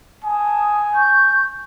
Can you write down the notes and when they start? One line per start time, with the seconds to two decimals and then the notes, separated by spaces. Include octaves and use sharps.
0.24 G#5 A5 D#6
0.93 C#6 G6